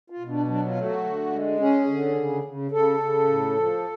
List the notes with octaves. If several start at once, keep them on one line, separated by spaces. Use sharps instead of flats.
F4
B2
D4
F#3 D4
F4
A3
F#4
D3
G#3
C#4 G#4
D3
C#3
C#3
C#3 A4
C#3
A2
F3